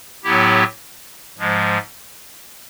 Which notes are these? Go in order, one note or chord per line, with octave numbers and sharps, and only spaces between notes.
A2 F#3 B3 E4 G4
G#2 F3 G#3